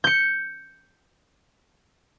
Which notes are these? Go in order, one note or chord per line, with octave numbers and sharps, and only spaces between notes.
G6 C#7